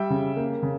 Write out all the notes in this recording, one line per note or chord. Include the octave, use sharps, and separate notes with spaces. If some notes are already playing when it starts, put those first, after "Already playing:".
Already playing: G3 E5 G5
C#3
A#3
C#3